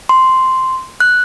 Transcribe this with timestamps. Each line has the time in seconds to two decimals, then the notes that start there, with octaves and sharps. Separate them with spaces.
0.09 C6
1.00 F#6